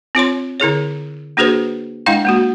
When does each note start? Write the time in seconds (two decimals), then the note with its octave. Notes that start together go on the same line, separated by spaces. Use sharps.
0.15 C4 F4 C#5 C6
0.60 D3 E4 G#4 C#5
1.37 A#3 D4 F#4 G#4 B4 C5
2.06 G#3 D4 E4 D#5 F5 G5
2.25 G#3 A#3 F#4